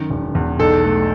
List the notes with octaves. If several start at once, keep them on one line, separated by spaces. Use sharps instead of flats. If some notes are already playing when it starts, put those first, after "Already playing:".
Already playing: F#2 D#3
E1
E2
B1 A4
A3